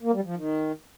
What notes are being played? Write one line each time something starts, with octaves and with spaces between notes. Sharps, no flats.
A#3
G3
F3
D#3